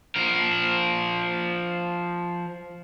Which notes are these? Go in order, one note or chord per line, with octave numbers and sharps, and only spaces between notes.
F3 A#4